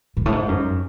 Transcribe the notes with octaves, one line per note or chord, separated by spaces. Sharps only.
G#2
A2
G#2
F#2